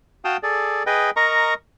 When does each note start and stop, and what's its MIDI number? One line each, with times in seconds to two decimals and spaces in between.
0.25 0.37 66
0.25 0.37 77
0.25 0.37 79
0.25 0.37 81
0.25 0.37 87
0.43 0.83 68
0.43 0.83 69
0.43 0.83 74
0.86 1.10 68
0.86 1.10 71
0.86 1.10 75
0.86 1.10 79
1.16 1.54 70
1.16 1.54 75
1.16 1.54 82
1.16 1.54 85